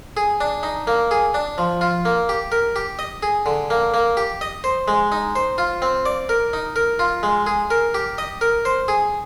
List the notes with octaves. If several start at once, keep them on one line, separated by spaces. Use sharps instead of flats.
G#4
D4
D#4
A#3
G#4
D4
F3
F4
A#3
G4
A#4
G4
D#5
G#4
D3
A#3
A#3
G4
D#5
C5
G#3
D#4
C5
F4
C4
D5
A#4
D#4
A#4
F4
G#3
G#4
A#4
G4
D#5
A#4
C5
G#4